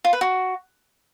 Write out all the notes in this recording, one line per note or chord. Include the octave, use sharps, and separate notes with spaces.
F4
B4
F#4